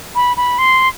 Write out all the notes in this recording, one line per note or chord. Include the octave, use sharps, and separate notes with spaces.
B5
B5
C6